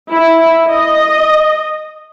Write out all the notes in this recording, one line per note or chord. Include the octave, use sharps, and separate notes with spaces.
E4
D#5